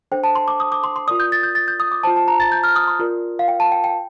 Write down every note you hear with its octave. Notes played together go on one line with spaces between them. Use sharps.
D4 A4 C5 G5
A5
C6
D6
D#6
D6
C6
C6
F4 A#4 D5 D#6
G6
A6
G6
A6
G6
D#6
D6
F4 C5 A5
A5
A#5
A6
G6
F6
D#6
C6
F4 A#4 D5
F5
G5
A5
G5
G5